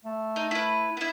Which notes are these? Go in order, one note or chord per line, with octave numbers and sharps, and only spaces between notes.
A3
D#4
E4 B4
B3 E4